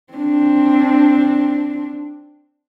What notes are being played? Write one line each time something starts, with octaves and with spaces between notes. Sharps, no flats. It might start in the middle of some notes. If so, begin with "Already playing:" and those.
C4 D4